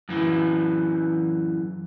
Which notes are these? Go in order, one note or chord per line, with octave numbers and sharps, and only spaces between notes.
F#2 E3